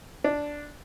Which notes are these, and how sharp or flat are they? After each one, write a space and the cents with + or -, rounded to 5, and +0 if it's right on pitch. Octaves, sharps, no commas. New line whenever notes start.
D4 -5